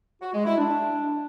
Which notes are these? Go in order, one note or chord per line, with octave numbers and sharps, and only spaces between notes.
F#4
G#3
E4
D4